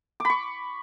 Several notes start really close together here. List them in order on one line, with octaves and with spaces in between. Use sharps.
D6 B5 C#6